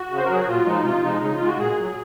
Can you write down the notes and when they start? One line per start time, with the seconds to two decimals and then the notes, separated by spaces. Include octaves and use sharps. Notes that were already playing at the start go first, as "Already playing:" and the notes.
Already playing: F#4
0.10 C#3
0.17 C5
0.25 A#4
0.29 F#3 G#4
0.40 F#4
0.47 A#2 F4
0.66 F3 G#3 D#4
0.84 C3 F4
1.03 F3 G#3 D#4
1.21 C#3 D#4
1.34 F4
1.40 G#3
1.46 F#4
1.59 A#2 G#4
1.78 F#3